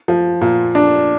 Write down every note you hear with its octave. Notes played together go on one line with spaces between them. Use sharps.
F3
A#2
D4